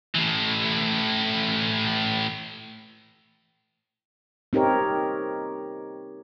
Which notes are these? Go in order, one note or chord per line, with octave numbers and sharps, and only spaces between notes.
A2 E3
C4 D#4 G4 A#4 C#5